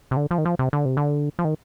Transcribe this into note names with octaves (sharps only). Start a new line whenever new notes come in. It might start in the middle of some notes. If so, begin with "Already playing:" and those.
C3
D3
F3
D#3
F3
C3
D3
C3
D3
F3
D#3